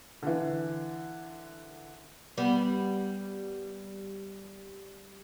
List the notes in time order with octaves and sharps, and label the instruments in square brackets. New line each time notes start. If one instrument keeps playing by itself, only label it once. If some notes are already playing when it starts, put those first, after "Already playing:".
[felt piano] D3 E3
[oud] G3 B3